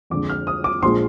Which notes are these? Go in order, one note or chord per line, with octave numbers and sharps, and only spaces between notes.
F2 D3 G#3 D6
F6
D#6
D6
A#1 A#2 F3 G#3 C6